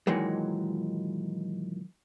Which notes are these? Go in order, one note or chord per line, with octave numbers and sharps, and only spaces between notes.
A#2 D#3 E3 F#3 G#3